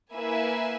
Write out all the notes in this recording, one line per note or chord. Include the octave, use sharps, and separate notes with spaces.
A#3 E4 B4 E5 G#5